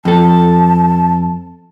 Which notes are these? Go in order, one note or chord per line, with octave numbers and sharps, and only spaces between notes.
F2 A4 A5